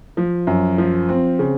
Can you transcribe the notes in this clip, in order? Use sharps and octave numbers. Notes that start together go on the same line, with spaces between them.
F3
F#2
F3
C4
C#3